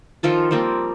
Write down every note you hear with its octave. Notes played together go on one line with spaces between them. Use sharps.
D#3 F3 F4 A4
F3 G3 A#3 C4